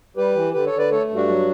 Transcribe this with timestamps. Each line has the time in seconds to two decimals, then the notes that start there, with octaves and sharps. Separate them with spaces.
0.17 G3 G4 B4
0.35 E3
0.54 D3 G4 B4
0.66 A4 C#5
0.72 D3
0.78 B4 D5
0.91 A3 A4 C#5
1.10 G2
1.16 D4 F#4
1.29 F#3